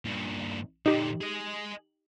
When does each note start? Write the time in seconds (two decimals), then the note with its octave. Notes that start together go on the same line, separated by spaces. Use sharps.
0.05 G2 A#2
0.86 A#2 D3 D#4 G4
1.21 G#4 D#5